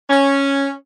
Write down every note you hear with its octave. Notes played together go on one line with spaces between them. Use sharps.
C#4